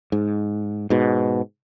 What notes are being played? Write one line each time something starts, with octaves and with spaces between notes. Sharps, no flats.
G#2
G#2 B2